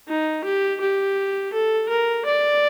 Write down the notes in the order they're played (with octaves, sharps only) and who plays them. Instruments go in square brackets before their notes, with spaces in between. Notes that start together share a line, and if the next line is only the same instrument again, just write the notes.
[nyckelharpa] D#4
G4
G4
A4
A#4
D5